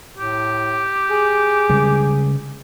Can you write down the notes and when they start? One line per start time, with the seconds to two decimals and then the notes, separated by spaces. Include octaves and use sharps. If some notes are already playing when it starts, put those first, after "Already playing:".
0.18 A2 G4
1.10 G#4
1.69 C#3 G3 G#3